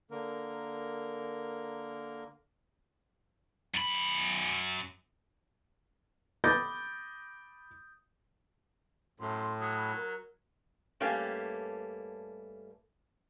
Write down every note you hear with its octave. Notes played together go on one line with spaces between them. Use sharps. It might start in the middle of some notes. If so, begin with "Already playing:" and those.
D3 A#3 A#4
F#2 B5
B5 D6 D#6 G6 A6 A#6
F#2 A2 C6
C6
F#3 D#6
B5
A#4
G2 A3 A#3 C#4 G4